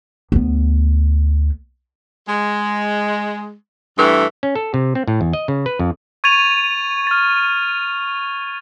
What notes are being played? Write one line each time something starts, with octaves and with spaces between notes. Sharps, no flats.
D2 B3
G#3
G2 E3 A3
C#4
A4
C3
C4
A2
E2
D#5
C#3
B4
F2
C#6 G#6 A6 D#7 F7
F6 A6